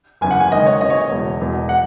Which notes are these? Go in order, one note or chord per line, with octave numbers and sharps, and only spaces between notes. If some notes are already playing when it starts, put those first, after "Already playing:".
F#1 E2 C#3 G#5
F#5
G#5
G#1 G#2 D#3 D#5
C#5
D#2 C#3 E3 D#5
C#5
D#5
E1 E2 B2
E1 E2 B2
E3 F#5